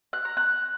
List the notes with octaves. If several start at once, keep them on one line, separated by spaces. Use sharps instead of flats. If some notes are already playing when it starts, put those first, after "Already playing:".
F#6
A#5
F#6